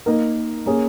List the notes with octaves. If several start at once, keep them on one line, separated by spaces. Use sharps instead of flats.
A#3 D#4 A#4
A#3 C#4 G#4